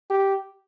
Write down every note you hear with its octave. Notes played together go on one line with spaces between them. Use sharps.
G4